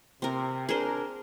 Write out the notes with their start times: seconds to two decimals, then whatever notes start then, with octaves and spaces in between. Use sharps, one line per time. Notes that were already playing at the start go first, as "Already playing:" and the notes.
0.22 C3 C4 A#4
0.69 D4 G#4 A#4 C5